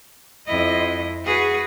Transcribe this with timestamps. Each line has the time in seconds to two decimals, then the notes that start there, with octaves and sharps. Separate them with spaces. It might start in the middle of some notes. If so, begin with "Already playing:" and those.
0.46 F2 E4 D#5
1.24 F#4 G#4 B4